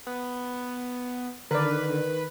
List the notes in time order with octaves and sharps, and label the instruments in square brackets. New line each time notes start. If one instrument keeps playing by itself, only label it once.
[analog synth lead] B3
[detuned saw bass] D3 [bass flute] D#3 [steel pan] A#4 D5 [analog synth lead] B4